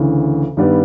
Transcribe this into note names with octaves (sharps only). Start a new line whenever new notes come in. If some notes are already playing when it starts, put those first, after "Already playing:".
Already playing: D2 C#3 E3
G2 D#3 G3 B3